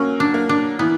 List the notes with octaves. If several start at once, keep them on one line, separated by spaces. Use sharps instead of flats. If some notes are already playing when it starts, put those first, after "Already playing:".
Already playing: F#3 A#3 C#4
D4
A#3
D4
E3 B3